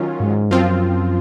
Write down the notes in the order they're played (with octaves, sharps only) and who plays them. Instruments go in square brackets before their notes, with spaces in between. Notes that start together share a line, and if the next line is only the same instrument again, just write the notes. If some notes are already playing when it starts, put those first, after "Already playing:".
Already playing: [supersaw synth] D#3 F#3 C#4 F4
[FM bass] G#2
[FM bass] F#2 [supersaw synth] F3 C4 F4